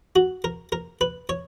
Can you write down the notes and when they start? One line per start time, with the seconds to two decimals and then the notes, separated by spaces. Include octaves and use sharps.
0.16 F#4
0.44 A#4
0.72 A#4
1.01 B4
1.29 C#5